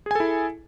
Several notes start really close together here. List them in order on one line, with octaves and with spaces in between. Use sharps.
G#4 G#5 A4 E4